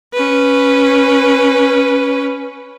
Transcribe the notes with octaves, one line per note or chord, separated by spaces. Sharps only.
C#4 B4